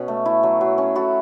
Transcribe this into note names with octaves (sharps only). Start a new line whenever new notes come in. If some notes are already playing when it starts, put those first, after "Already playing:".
Already playing: B2 C#4
A3
E4
F#3
F#3
C#4
E4 F#4 A4